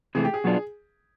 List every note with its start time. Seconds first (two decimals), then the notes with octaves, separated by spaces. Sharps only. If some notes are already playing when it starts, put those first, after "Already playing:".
0.15 C3 E3 A3 G#4
0.25 G4
0.34 G#4
0.44 B2 F#3 B3 D4 F4